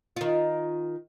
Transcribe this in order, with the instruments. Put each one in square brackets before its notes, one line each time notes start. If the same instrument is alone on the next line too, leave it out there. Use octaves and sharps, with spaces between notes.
[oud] D#3 F4